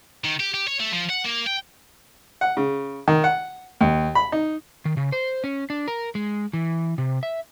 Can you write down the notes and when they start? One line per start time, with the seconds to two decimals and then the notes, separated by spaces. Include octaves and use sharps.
0.24 D#3
0.40 G4
0.54 G4
0.68 C#5
0.80 A3
0.93 F3
1.10 F#5
1.25 A#3
1.47 G5
2.41 F#5
2.57 C#3
3.08 D#3
3.24 F#5
3.81 D#2
4.15 B5
4.32 D#4
4.85 D#3
4.97 C#3
5.12 C5
5.44 C#4
5.70 D4
5.88 A#4
6.15 G#3
6.53 E3
6.98 C3
7.23 E5